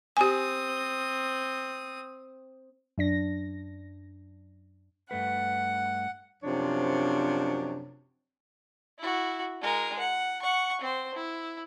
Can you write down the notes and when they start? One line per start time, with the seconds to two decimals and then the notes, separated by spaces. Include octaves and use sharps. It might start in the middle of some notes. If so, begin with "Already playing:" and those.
0.17 C4 G4 G#5 D#6
2.98 F#2 D4 A#6
5.11 G2 A3 B4 F#5
6.43 F#2 C3 F3 D4 C#5
8.99 E4 F#4
9.61 G#3 A#4
9.99 F#5
10.42 F#5 C#6
10.81 C4 C5
11.14 E4